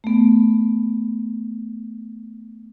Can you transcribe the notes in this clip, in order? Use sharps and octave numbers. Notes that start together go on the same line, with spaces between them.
A3 B3